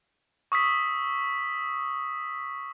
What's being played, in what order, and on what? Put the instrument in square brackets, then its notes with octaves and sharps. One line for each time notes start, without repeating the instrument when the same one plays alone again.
[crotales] C#6 D#6 E6 B6